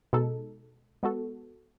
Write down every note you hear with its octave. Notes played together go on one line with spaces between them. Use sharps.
B2 G#3 D#4 A4
G#3 B3 F#4 A4